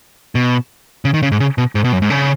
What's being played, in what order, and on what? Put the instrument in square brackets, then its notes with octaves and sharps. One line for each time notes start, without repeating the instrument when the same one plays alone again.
[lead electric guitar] B2
C#3
D#3
C#3
G#2
C#3
B2
G#2
B2
F#2
G#2
C#3